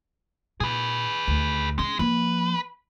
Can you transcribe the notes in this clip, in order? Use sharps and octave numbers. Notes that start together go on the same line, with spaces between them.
A#2 G#4 B4
D2
G#3 C#4
F3 A#3 B4